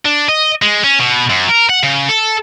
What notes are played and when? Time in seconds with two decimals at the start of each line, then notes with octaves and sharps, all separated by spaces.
0.06 D4
0.29 D#5
0.62 G#3
0.84 C#4
0.99 B2
1.30 F#2
1.49 A#4
1.70 F#5
1.83 C#3
2.09 A4